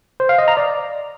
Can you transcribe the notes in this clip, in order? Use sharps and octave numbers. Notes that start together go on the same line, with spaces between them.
C5
F5
D#5
A#5
D5